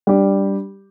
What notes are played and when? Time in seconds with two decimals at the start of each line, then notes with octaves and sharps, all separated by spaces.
0.07 G3 D4 G4